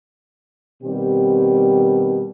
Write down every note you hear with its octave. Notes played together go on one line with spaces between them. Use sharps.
B2 D#3 G3 C4 G4